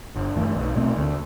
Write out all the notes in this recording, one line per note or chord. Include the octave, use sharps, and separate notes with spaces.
G1
G2 E3 A3
B1
B2 A3 C4
D2